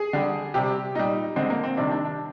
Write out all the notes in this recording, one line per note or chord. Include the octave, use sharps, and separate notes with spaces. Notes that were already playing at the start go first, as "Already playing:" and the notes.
Already playing: G#4
D3 G3
C3 G3 G4
A#2 G3 D#4
D3 G#3 C4
A#3
C4
C3 D#3 G3 D4
D4
D4